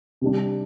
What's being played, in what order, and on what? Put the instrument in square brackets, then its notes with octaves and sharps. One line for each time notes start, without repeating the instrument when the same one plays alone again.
[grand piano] C3 G3 D4